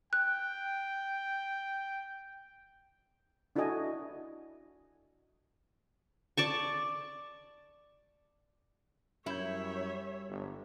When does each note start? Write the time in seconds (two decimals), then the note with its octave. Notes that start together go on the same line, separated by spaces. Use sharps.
0.13 G5 F#6
3.56 D4 E4 F#4 A4 D#5 G#5
6.37 D5 A5 C#6
9.26 F#2 G3 E4 C#5 E5 G6
10.29 G1